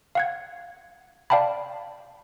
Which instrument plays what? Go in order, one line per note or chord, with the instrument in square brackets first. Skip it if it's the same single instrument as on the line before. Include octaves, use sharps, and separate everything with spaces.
[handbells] F5 F#5 G#6
D5 F5 G5 A5 B5